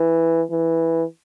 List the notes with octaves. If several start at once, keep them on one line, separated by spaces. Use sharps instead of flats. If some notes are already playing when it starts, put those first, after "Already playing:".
Already playing: E3
E3